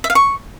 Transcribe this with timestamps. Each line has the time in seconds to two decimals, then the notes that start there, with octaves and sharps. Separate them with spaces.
0.04 E5
0.10 F5
0.15 C#6